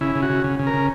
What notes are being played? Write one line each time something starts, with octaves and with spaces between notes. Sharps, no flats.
C#3 E4
C#3
F#4
C#3
C#3
C#3
A#4
C#3